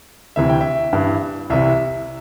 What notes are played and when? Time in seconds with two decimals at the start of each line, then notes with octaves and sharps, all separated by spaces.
0.36 D2 C3 E3 E5
0.49 G5
0.61 E5
0.93 G2 E3
1.50 C2 C3 E3 E5